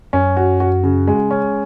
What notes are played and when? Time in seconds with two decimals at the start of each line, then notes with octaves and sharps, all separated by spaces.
0.13 F#2 C#4
0.37 F#4
0.60 F#4
0.83 C#3
1.08 G#3
1.31 C#4